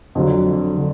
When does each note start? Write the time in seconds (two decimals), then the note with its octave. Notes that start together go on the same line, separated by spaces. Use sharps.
0.15 F2 D3 F#3
0.77 D3